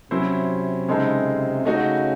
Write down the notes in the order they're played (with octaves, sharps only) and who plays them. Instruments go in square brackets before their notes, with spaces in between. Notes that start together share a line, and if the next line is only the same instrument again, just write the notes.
[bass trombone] C3 [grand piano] F#3 C#4 E4 C5
[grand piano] C#3 G#3 C4 D#4 A4
[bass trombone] C#3 [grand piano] A3 D#4 F#4